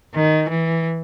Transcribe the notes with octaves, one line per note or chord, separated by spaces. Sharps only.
D#3
E3